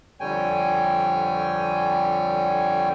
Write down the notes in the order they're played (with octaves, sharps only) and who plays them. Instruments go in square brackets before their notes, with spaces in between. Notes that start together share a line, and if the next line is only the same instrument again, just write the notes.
[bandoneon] F2 D3 G3 C#5 G5 G#5